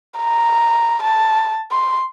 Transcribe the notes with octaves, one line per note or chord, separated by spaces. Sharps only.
A#5
A5
C6